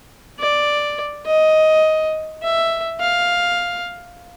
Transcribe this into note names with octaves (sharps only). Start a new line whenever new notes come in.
D5
D#5
E5
F5